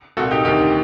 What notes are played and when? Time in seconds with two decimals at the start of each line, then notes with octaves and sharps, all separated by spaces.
0.17 C2 A#2 F#4 A4
0.31 D#4 G4
0.44 D2 C3 D#3 D#4 G4